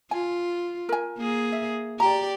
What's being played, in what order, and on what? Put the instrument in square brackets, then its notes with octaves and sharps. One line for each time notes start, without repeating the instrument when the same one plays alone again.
[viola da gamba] F4 [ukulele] G#5
[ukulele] A#4 G#5
[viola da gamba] A#3 G#4
[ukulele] E5
[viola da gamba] G4 D5 [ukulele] A#5